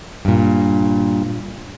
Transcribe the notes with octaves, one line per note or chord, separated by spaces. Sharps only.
G2 A#2